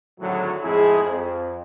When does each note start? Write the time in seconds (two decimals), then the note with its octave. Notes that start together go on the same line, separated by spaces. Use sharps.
0.20 G#1 A2 D3 F#3
0.63 F2 A2 G#3 E4 G#4
1.03 F2